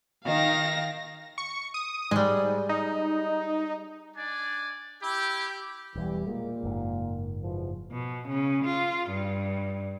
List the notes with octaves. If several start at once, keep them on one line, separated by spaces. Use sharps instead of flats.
D#3 D#4 F5 A#6
C#6
D#6
G#2 G3 G#3
D#4
D4 D5 G#5
E4 G4
E1 E2 E3 G3
A#2 G#3 A#3
F#1 G#2
E2 B2 F3
B2
C#3
F4
G2